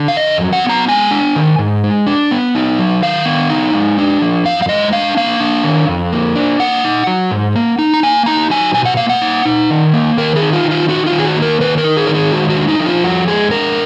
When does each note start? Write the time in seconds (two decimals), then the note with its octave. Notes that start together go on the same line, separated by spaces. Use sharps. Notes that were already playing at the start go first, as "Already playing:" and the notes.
Already playing: D3
0.08 F5
0.16 F2 D#5
0.41 F#3
0.53 F#5
0.65 B3 A#5
0.88 G#3 G#5
1.11 D4
1.36 D#3
1.59 G#2
1.84 G#3
2.07 D4
2.31 B3
2.55 D#4
2.79 F#3
3.02 D#3 F5
3.26 B3
3.50 D#4
3.73 G#3
3.98 D4
4.22 F3
4.45 F#2 F5
4.62 F5
4.69 G#3 D#5
4.93 D4 F5
5.17 A#3 F5
5.40 D4
5.64 D#3
5.88 F2
6.13 A#3
6.36 D4
6.60 A#3 F#5
6.84 D#4
7.07 F#3
7.31 G#2
7.55 A#3
7.79 D#4
7.94 A#5
8.03 A#3 G#5
8.26 D#4 A#5
8.50 F#3 G#5
8.74 B2 G#5
8.85 F#5
8.97 A#3 F5
9.09 F#5
9.22 D#4
9.45 D#4
9.70 D#3
9.94 A#3
10.17 D#3 A#4
10.36 G#4
10.42 D#4
10.53 F4
10.65 D#3
10.71 F4
10.88 D#4 F#4
11.06 F4
11.12 D#3
11.19 G#4
11.25 F#4
11.36 A#3
11.42 A#4
11.60 D#3 B4
11.78 A#4
11.84 D#4
11.97 G#4
12.07 D#3 A#4
12.14 G#4
12.32 G#3 F#4
12.49 F#4
12.56 D4
12.68 D#4
12.80 F3
12.86 F4
13.03 F2 F#4
13.28 G#3 G#4
13.51 D4 A#4